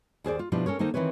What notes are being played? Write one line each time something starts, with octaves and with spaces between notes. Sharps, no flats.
D#2 G#4 C5 D5
F4
B2 F3 D4 E4 G4
C#4 A4 A#4 C#5
D#3 A#3 D#4 A4 C5
D#3 E3 C4 B4 C#5